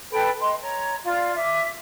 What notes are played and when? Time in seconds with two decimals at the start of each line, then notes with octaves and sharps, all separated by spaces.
0.11 A4 B4 G5 B5
0.40 D#5 C6
0.62 C#5 A#5
1.04 F4 D5 F5
1.36 E5 D6